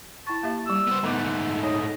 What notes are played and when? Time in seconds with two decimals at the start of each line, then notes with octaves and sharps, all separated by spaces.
0.27 E4 A5 C#6
0.43 A#3 G4 E5
0.66 G3 G4 E6
0.88 B3 C5
1.04 G#2 D3 A3 B3 B4 D6
1.63 D#4 C#5 D#5 G#5